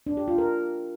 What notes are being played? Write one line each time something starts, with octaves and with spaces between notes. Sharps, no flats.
D4
G4
F4
A#4